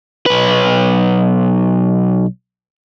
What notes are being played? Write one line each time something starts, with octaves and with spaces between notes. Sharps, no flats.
B1 B4